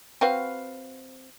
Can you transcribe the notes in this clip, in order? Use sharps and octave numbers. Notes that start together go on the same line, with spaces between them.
C4 F#4 B4 F5